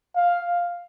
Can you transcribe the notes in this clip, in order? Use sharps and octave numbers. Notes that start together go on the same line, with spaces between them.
F5